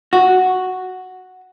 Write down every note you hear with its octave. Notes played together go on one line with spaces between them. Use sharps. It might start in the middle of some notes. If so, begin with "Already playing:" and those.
F#4